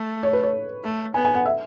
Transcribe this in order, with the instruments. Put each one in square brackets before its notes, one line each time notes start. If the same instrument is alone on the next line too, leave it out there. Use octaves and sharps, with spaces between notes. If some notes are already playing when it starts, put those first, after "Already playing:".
Already playing: [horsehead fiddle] A3
[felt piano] C#5
B4
C#5
[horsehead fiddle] A3
[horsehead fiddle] B3 [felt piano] G#5
[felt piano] G#5
F#5
E5